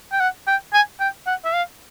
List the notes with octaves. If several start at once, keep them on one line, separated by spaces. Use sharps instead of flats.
G5
F#5
G5
G#5
G5
F#5
E5
F5